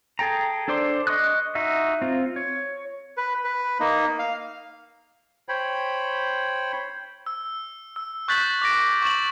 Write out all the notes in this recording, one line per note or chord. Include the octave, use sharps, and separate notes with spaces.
G#4 A4 G5 A#5
D4 A4 C5 D5 C6
D#5 C6 C#6 D#6 F#6
D#4 F#4 E5
C4 F4
C#5
B4
B4
A#3 D#4
F5
C5 C#5 G5 B5
E6
E6
C#6 F#6 G6 A6 B6 F#7
D6 F#6 A#6 D7
C#6 A6 E7 F#7